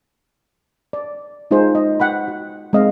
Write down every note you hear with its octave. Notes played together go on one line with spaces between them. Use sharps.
D5
G#3 D#4 F4 G#4 C5
D#5
F#5 G5 B5
F#4
G#3 C4 D#5 F5